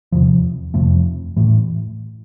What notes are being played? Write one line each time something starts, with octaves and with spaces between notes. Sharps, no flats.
E2 C3 F3
F2 C3 F3 A3
A2 E3 A3